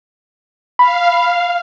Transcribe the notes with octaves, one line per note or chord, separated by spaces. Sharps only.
F5 B5